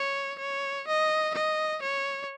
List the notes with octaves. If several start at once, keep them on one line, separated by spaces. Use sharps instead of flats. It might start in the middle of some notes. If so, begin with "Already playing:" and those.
Already playing: C#5
C#5
D#5
D#5
C#5